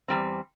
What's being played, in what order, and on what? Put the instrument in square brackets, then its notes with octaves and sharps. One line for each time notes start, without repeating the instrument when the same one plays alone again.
[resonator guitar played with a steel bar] E2 B2 G3 C4